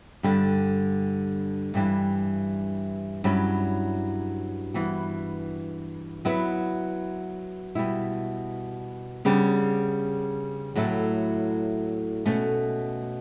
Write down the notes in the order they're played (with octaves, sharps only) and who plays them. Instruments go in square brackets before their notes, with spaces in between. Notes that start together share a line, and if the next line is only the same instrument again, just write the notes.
[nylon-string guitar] G2 D3 G3
G2 E3 G3 D4
G2 F#3 C#4 E4
G2 E3 B3 F#4
F#3 B3 E4 B4
B2 G3 B3 E4
C#3 G3 B3 D4
A2 F#3 A3 E4 A4
B2 A3 C#4